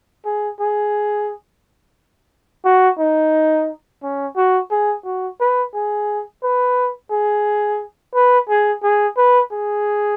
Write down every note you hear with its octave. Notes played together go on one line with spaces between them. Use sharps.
G#4
G#4
F#4
D#4
C#4
F#4
G#4
F#4
B4
G#4
B4
G#4
B4
G#4
G#4
B4
G#4